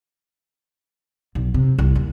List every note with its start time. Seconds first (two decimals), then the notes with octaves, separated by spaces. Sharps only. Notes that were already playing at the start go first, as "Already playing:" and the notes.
1.35 B1
1.54 C3
1.78 C2
1.95 D#2